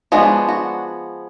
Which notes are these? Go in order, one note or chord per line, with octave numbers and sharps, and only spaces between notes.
F3 G#3 B3 D4 F#4
F#4